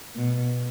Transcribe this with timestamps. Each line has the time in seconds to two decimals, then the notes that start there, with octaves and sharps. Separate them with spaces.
0.16 B2